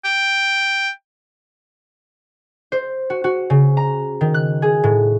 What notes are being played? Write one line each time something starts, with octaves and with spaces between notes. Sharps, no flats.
G5
C5
F#4
F#4
C#3
A#5
D#3
F#6
G#4
A2